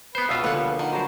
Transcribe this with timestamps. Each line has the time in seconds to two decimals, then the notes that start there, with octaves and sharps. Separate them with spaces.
0.15 B3 B4 C5
0.29 C#2 B2 F4 E5 F5
0.44 A#2 D3 F3 G3 B3 B4 F#5
0.79 D#3 F#5
0.93 F#3 G3 A#4 C5 A5